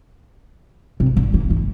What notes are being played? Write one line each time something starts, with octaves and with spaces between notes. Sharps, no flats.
C3
D3
E3
E3